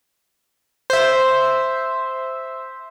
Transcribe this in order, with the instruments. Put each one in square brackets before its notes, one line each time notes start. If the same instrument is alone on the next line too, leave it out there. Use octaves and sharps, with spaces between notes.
[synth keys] C5 E5